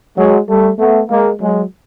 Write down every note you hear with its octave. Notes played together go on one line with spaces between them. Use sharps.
F#3 G#3
G3 A3
A3 B3
G#3 A#3
F#3 G#3